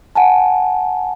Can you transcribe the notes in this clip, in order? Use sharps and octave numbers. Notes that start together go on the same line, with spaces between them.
F#5 G#5 A5